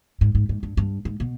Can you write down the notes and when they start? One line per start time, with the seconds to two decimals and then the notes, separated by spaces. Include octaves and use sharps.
0.21 G#2
0.35 G#2
0.49 G#2
0.63 G2
0.77 G2
1.05 G#2
1.20 B2